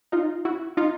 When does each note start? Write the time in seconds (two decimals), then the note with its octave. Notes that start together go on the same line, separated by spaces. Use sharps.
0.12 D#4 F4
0.45 E4 F#4
0.77 D#4 F4